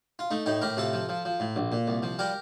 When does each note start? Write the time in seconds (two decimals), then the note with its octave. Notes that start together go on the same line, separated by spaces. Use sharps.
0.19 F4
0.31 A3 D#4
0.46 A2 D#4 G4
0.61 A2 G4 A#4
0.77 C3 F4 A4
0.93 F3
1.09 F3
1.25 F3
1.40 A2
1.56 A#1
1.72 A#2
1.88 C2
2.03 F3
2.19 G3 G4 A#4